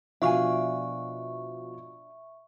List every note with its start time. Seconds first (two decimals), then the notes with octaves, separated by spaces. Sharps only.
0.22 B2 F3 D4 E5 F5 G#5 C#6